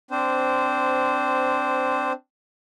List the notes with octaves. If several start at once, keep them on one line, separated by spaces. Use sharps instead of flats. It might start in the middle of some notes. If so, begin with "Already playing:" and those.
C4 D4 C5